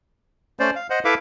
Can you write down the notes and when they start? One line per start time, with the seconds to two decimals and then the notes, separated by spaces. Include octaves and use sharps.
0.59 A3 C#4 C5 D5
0.76 F5
0.90 C5 D#5 F#5
1.05 E4 A4 B4 E5 F5 D6